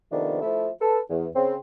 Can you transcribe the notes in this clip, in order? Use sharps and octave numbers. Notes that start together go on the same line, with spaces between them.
C3 D#3 F3 A3 B3 D4
F3 A3 E4 E5
A4 B4
E2
C#3 C4